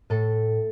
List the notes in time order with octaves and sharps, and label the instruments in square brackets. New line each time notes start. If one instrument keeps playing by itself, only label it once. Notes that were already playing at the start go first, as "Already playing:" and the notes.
[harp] A2 A4